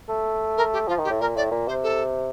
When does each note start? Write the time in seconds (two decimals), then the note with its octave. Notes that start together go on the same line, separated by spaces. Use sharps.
0.09 A3
0.57 A#4
0.72 G4
0.88 F3 F4
0.99 D#3
1.04 G4
1.10 A2
1.20 A#2 A#4
1.35 A2 D5
1.51 A#2
1.67 C3 C5
1.83 A4